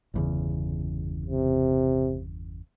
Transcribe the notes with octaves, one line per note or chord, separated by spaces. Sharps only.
G1 E2 C#3
C3